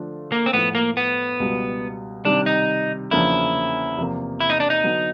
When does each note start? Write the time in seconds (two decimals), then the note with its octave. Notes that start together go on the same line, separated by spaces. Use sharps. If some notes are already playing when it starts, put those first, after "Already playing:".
Already playing: D3 F3 A3 D4 F4
0.32 A#3
0.46 C4
0.53 A2 F3 A3 B3
0.75 A#3
0.97 B3
1.40 C#2 B2 G3
2.25 C3 D#3 G3 D4
2.46 D#4
3.11 E2 C#3 F3 A#3 D4 E4
3.97 E2 C3 F3 A#3
4.40 E4
4.50 D#4
4.60 D4
4.70 D#4
4.83 D3 F#3 B3 D4 F#4